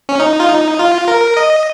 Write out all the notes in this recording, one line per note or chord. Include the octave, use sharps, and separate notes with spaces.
C#4
D#4
F4
D#4
F4
A#4
D#5